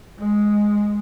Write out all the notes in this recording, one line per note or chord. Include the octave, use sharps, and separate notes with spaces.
G#3